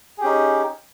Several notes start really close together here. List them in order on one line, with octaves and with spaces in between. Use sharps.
G#4 G4 C#4 D#4